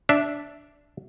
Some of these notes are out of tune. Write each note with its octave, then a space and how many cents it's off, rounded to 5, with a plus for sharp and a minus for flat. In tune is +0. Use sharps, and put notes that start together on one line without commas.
D4 -5 E5 +0